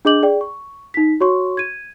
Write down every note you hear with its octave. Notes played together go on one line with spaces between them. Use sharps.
D4 G#4 D#5 D6 G6 F#7
G#4 D5 G5
C#6
D#4 B6
F#4 C#5 C6 C#6
G#6 D#7